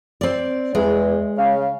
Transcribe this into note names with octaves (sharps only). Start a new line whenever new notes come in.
C4 D5
E2 G#3
C#3 F5